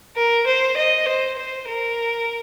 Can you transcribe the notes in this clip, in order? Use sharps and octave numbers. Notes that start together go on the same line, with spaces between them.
A#4
C5
D#5
C5
C5
A#4